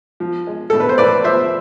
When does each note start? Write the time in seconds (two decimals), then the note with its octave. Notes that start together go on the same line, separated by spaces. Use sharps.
0.20 F3
0.47 G#3
0.70 A2 A4
0.80 B4
0.89 C5
0.98 A2 B4 D5
1.24 F3 C5 E5